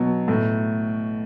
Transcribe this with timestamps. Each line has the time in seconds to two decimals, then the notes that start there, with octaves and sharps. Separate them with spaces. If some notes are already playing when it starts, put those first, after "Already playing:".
Already playing: B2 F#3
0.28 A2